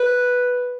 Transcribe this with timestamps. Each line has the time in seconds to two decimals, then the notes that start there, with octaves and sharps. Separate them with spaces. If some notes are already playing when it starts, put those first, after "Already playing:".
Already playing: B4